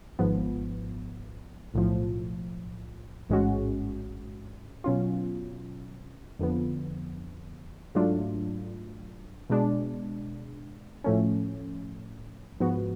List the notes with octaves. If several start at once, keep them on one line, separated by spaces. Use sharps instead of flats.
G#1 G#2 F3 B3
B1 A2 F3
A1 G#2 G#3 C#4 F#4
B2 F#3 C#4 F4
F2 D3 F3 B3
G#2 F#3 A3 D4 F4
B2 G#3 D4
A2 F3 A3 C#4
G#2 F3 B3 F#4